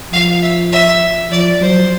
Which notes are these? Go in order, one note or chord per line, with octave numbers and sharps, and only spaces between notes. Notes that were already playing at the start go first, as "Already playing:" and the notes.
F3 F5
E5
E5
F3 D5
F#3 C5